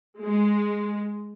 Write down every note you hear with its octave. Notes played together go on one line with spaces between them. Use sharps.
G#3